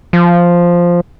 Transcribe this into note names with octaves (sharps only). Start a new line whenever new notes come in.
F3